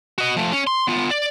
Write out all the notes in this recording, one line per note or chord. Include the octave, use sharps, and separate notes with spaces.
F#4 D#5
F3 A3
C#4
C6
B3 F4
D5